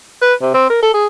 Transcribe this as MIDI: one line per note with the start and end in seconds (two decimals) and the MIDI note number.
0.22 0.34 71
0.42 0.54 48
0.54 0.65 60
0.70 0.78 70
0.82 0.90 69
0.94 1.07 68